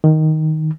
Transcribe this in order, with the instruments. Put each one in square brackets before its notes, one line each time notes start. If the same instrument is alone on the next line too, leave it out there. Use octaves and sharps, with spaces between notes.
[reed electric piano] D#3